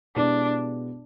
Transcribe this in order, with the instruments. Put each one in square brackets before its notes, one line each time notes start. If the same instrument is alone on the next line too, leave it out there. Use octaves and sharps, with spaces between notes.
[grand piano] B2 G#3 B3 E4 G4 [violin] D4